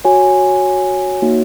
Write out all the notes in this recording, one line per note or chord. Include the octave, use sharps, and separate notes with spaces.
F#4 C#5 G#5
A#3 D#4 F#4 C#5